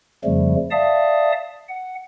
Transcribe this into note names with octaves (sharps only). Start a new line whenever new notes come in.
F2 C#3 F3 G3 A3
D5 E5 F5 A5 D#6
F#5